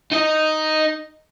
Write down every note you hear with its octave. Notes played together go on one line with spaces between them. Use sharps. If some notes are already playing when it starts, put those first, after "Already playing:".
D#4 D#5